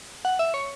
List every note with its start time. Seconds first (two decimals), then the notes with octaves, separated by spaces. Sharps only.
0.25 F#5
0.39 E5
0.54 C#5